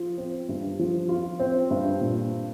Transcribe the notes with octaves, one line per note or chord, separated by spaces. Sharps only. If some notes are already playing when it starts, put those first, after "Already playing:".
Already playing: F3 F4
C4
G2
F3
F4
C4
G2
A#2